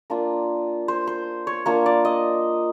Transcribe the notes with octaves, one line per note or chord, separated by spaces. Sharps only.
A#3 D4 F4
C5
C5
C#5
A#3 D4 F4 C#5
D5
D#5